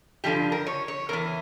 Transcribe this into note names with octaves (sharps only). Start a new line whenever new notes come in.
G2 D3 F3 G4
A#4
C#5
C#5
E2 E3 A#4